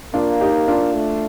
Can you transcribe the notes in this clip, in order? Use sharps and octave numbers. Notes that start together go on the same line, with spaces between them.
A#3 D4 F4
D#4 G4
D4 F4
A3